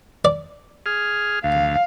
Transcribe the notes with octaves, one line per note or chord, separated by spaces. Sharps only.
D5
G#4 F6
D2 F5